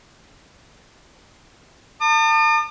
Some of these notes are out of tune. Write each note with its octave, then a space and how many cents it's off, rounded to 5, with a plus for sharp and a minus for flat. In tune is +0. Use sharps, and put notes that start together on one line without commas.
A5 +35 D#6 -45